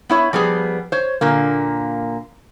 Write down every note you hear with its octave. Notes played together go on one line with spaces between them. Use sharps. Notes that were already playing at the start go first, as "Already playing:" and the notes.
B3 E4 C#5
F3 G3 B3 G#4
C5 C#5
A#2 D3 A#3